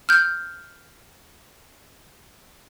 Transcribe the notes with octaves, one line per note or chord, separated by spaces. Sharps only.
F6 G6